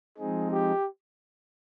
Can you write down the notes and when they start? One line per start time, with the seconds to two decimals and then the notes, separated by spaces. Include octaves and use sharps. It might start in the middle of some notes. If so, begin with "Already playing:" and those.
0.18 F3 G#3 C4 D#4 G#4
0.52 G4